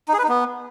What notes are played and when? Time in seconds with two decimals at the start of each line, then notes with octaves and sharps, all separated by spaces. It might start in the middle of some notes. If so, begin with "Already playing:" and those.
0.08 D#4
0.13 G#4
0.19 B4
0.24 D#4
0.29 B3